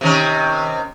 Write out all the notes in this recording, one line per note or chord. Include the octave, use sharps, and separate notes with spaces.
C3 D#3 C#4